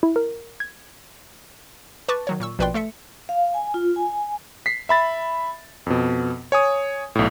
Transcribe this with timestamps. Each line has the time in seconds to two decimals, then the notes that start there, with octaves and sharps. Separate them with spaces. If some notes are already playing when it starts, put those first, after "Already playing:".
0.03 E4
0.16 A#4
0.60 G#6
2.08 B4 A5 C#6 D6 A6
2.27 D#3 F#3 C#5
2.40 A#2 C#6 E6
2.59 A#1 B2 B4 D5 G5 C6
2.74 A3 A4 E5 C#7
3.29 F5
3.54 G#5
3.74 F4
3.96 G#5
4.66 B6 C7
4.89 E5 B5 A6
5.86 F2 B2
6.52 C#5 G#5 D#6
7.15 B1 A2